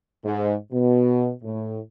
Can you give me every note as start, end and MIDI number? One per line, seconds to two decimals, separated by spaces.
0.24 0.53 44
0.72 1.29 47
1.43 1.78 45